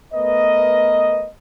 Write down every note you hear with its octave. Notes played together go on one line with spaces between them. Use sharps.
A3 B3 A#4 B4 D#5